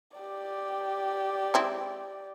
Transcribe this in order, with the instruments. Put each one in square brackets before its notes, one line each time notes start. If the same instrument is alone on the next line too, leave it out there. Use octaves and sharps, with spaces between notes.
[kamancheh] G4 D5
[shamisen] G#3 C4 E4